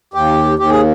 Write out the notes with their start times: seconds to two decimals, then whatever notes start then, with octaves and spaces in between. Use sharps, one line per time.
0.14 D#2 G4
0.59 D#2 G4
0.70 G#4